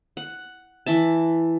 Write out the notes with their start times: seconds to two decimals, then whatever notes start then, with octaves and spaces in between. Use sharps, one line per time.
0.17 F#5
0.86 E3 E5 A5